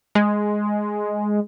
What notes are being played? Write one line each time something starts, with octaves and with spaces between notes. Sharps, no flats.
G#3